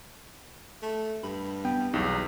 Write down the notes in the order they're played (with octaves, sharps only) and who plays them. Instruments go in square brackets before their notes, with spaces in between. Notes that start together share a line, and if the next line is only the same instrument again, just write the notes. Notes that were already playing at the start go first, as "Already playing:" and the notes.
[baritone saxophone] A3
[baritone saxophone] G2 [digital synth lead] B5
[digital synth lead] B3 [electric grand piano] G5
[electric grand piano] B1 E2 [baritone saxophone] G3 [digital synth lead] D#4